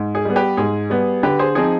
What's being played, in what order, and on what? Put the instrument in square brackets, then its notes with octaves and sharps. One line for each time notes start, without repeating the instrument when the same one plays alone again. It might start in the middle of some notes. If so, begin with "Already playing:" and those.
Already playing: [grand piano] G#2
G#4
G3 B3
G4 B4
G#2 G#4
G3 B3
D3 G4 B4
G#4 C5
F3 C4 D#4 G#4